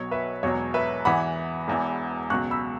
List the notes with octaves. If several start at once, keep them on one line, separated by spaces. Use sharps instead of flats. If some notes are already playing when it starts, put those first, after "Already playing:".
Already playing: B1 B2 F#3 C#5
B4 E5
E1 E2 B2 F#3 C#5
B4 E5
E2 E3 F#5 B5
E1 E2 E3
C#2 B2 F#3 C#6 F#6
B5 E6